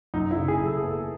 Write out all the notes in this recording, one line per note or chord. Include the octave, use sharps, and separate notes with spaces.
F#2 D#4
E4
C#3
G#4
F#2
A4
G#4
B3
A4